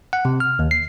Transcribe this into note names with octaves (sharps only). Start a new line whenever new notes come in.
F#5
C3
F6
D#2
C7